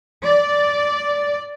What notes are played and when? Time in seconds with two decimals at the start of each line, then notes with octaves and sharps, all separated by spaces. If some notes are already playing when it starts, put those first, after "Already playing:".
0.23 D5